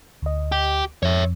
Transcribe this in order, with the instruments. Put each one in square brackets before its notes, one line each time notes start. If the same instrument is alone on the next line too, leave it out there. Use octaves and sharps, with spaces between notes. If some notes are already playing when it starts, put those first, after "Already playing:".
[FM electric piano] D2 D#5
[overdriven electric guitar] G4
[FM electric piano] F2 [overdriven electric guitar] C#5 E5